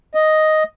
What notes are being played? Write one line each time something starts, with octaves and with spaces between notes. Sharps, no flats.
D#5